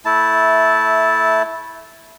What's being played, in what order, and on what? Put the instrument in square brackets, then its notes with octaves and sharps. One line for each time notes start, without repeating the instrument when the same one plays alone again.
[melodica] A3 E4 A5